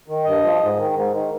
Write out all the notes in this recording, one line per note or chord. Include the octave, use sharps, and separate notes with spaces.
D#3
G2 D#5
F3
G#2
D#3
G#2
D#3